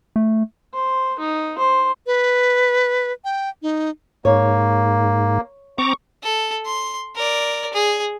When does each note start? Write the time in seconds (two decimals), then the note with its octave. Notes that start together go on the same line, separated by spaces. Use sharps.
0.16 A3
0.74 C5
1.19 D#4
1.58 C5
2.07 B4
3.25 G5
3.62 D#4
4.25 G#2 A#3 C#5
5.78 C4 A#5 C#6 D6
6.23 A4
6.66 C6
7.16 A#4 D5
7.73 G#4